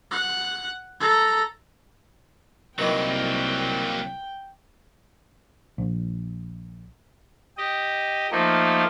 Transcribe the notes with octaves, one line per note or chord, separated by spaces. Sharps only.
F#5
A4 A#5
C2 D#3 E3 F#3 A#3 G5
A#1
G4 D#5
F3 A3 A#3 D#4